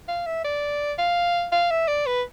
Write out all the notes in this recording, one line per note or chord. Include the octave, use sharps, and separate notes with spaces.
F5
E5
D5
F5
F5
E5
D5
B4